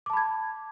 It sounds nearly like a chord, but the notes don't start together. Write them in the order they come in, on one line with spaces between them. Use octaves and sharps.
D6 A5 B5 G#6